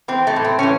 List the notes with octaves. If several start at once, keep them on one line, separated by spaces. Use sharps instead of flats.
E3 C4
A3
A2
C4
E3 C#4